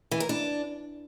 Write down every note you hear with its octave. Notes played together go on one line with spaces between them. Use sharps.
E3
A#4
D4